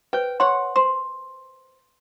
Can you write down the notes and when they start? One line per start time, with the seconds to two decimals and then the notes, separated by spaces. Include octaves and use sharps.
0.13 B4 C5 G5
0.40 C#5 F#5 C6
0.76 C5 C6